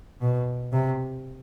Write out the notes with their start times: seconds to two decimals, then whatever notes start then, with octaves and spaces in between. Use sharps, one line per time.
0.21 B2
0.73 C3